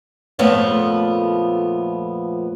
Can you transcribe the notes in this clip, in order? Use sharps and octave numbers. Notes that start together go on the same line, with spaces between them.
F2 A#2 F3 A3 B3 C#5